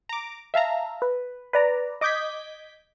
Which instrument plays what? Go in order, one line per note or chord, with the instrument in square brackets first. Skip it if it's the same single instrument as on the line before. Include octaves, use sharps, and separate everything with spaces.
[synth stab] A#5 D6
E5 F5 A5 A#5
B4
B4 D5 A#5
D#5 D6 D#6 G6 G#6 B6